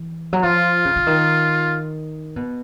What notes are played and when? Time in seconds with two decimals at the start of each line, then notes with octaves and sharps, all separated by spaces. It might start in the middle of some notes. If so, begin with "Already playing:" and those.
Already playing: E3
0.33 F#3
0.42 F3 F4
0.85 C#3
0.96 D3
1.07 D#3
2.36 B2